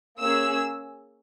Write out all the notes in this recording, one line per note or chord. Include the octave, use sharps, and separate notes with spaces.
A#3 C#4 G#4 E6